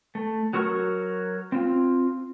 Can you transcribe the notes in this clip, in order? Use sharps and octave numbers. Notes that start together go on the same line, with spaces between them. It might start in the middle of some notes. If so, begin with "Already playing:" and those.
A3
F#3 F#4 A#4 C#6 F6
C4 F4